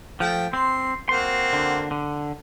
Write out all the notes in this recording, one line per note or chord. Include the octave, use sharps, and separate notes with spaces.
F3 A3 G5
C4 C6
A#3 C4 F#4 C6
D3
D3